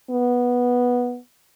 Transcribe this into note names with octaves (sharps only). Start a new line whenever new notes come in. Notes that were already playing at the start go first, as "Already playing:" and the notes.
B3